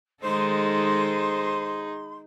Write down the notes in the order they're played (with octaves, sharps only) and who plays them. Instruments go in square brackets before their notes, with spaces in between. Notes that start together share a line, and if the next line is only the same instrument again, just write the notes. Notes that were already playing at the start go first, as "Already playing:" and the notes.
[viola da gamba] D#3 G#3 A4 [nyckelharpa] D#4 G#4 [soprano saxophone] C5 [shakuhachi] C6